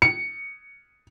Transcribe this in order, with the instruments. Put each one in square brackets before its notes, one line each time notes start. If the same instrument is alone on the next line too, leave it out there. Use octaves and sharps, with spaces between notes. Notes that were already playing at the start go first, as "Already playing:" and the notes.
[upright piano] C#7